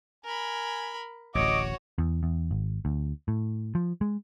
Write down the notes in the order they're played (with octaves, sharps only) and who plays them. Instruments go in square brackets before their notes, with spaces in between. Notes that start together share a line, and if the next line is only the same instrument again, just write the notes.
[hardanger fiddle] A#4 B5 [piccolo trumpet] G#5
[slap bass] D1 A1 [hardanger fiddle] F#4 C#5 [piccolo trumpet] D#5 [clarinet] D6
[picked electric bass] E2
E2
G#1
D2
A2
F3
G#3